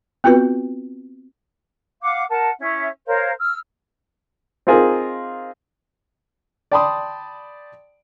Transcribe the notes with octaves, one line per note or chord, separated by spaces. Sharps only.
B3 C4 F4 F#4 B4
F5 F#5 D6
A#4 F#5 A5
C#4 E4 E5
A#4 C5 C#5 F5
E6 F6
C4 D#4 F4 G#4 A#4
D5 G5 A5 B5 C6 D#6